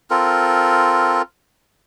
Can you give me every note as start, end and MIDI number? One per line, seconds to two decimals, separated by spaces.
0.10 1.22 60
0.10 1.22 65
0.10 1.22 69
0.10 1.22 70